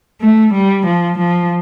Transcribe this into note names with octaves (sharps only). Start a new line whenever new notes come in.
A3
G3
F3
F3